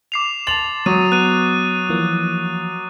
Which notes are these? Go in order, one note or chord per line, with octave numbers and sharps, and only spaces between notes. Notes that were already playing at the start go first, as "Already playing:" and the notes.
D6 C7 F7
A5 C6 A6 F7 F#7
F#3 C#6 D#6 D#7
B3 F#6 D#7
E3 F3 A#3